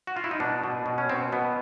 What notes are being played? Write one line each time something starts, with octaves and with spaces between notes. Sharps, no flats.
F#4
F4
E4
D#4
B2 D4
B2
B2
C#4
B2 C4
B2 B3